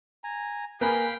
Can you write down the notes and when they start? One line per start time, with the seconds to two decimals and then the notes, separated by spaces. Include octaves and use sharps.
0.24 G#5 A#5
0.81 A#3 A#4 B4 F5 G5 G#5 B5